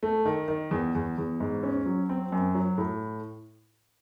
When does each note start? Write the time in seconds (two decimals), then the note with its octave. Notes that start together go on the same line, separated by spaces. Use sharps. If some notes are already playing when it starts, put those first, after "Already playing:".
0.03 A3
0.25 D#3
0.48 D#3
0.71 E2
0.95 E2
1.18 E2
1.40 G#2
1.63 C#4
1.86 F#3
2.09 C4
2.32 F#2
2.55 F#3
2.78 A2